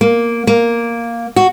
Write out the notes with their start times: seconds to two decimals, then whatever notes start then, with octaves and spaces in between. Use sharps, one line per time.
0.01 A#3
0.47 A#3
1.36 F#4